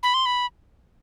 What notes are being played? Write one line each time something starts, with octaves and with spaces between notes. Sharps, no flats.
B5
C6
B5